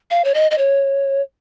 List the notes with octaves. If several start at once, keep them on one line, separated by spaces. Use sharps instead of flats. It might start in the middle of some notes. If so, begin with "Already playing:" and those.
F5
C#5
D#5
D#5
C#5